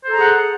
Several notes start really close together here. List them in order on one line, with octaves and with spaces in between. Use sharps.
C5 A4 A#5 G#4 F#5